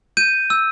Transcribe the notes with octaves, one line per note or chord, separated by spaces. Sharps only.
G6 D#7
E6